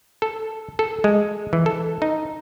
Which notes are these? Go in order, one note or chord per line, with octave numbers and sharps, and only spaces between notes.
A4
A4
G#3
E3
A4
D#4